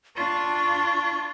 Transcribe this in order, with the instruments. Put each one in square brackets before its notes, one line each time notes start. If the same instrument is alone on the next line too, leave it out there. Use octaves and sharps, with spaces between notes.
[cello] D4 F4 [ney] C#6